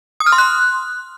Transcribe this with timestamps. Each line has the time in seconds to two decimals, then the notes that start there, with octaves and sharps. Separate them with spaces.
0.20 D#6
0.26 F6
0.32 C6
0.38 F#6